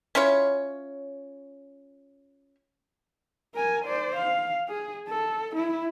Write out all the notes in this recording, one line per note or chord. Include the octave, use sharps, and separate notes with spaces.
C#4 E4 F4 C#5
A#4 G#5
C5 D5
F5
G#4
A4
E4